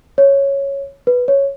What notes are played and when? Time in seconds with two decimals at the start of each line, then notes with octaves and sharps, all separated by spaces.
0.18 C#5
1.07 B4
1.28 C#5